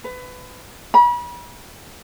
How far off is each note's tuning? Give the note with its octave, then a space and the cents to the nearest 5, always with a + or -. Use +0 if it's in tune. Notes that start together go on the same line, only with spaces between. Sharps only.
B4 +25
B5 -40